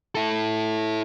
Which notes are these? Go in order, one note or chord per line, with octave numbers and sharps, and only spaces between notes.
E4 A4